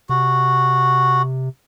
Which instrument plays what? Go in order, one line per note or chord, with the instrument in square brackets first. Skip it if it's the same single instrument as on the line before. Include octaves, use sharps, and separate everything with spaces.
[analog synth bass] C3 [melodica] F#4